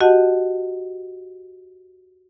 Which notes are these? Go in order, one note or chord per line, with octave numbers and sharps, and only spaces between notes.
F#4 G4 D#5 F#5 A5